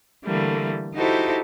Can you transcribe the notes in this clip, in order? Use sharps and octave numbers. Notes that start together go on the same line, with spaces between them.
D3 E3 G3 A3 A#3
D#4 E4 F#4 G4 A4 C5